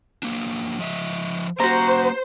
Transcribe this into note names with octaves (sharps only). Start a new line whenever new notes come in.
F#3 A#3 D4
F3 D#5 E5
A#3 C#4 F#4 C5 A#5